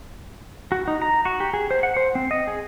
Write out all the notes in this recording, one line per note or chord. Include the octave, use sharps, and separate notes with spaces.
F#4
D#4
A#5
F#4
G4
G#4
C5
F#5
C5
C4
D#5
G#4